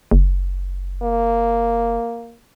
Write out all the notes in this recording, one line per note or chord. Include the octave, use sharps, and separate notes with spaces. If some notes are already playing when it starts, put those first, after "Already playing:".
F#1
A#3